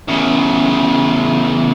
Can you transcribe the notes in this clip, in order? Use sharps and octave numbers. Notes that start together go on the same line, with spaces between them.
E2 C#3